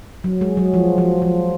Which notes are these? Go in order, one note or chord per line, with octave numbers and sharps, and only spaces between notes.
F#3
G#3
F#3
F3
F3
F3